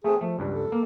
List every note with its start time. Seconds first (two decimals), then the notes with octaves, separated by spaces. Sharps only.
0.04 A3 C4 G#4
0.21 F3 A3
0.39 C#2 G2 G3
0.54 A4
0.72 A#3